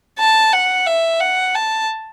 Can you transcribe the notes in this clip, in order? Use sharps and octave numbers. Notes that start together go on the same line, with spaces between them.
A5
F#5
E5
F#5
A5